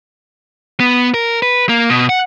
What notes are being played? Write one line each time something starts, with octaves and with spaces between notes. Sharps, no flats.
B3
A#4
B4
A#3
B2
F#5